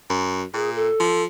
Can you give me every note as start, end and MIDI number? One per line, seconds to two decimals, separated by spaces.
0.10 0.44 42
0.54 0.89 46
0.54 0.70 68
0.76 1.23 69
1.00 1.25 53